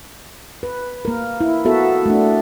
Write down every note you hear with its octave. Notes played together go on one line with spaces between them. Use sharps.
B4
A#3 A#4
E4
B3 F#4 A4 E5
A3 D4